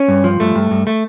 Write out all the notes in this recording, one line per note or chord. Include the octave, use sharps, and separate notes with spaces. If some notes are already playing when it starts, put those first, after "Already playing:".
Already playing: C#4
G2
F3
G2 A3
G2
G2
A3